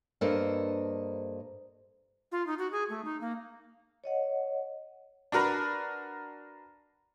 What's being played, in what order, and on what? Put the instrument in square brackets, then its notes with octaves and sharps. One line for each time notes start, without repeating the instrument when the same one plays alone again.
[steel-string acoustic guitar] G2 A#3 A4 C5 D#5
[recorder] F4
D#4
F#4
G#4
A3
D#4
A#3
[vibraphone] C#5 D#5 F#5
[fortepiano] D4 F#4 A#4 B4 A#5